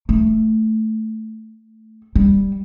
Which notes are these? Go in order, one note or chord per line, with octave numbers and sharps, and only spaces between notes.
A3
G3